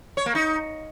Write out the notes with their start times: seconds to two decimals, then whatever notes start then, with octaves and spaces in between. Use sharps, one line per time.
0.17 C#5
0.26 A#3
0.35 D#4